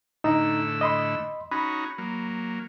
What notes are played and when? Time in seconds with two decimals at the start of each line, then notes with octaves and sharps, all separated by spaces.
0.24 A2 D3 D#4 A#5 E6
0.81 D#5 B5 C6
1.51 C#4 D#4 F#4 B5
1.98 F#3 A#3